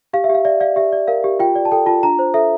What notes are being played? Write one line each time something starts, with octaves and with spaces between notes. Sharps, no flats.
G4 F5
E5
G4 F5
D5 E5
D5 F5
G4 E5
D5
A#4 F5
G4
F4 G5
D5
A5
A4 G5
F4 A5
D4 A#5
C5
A4 E5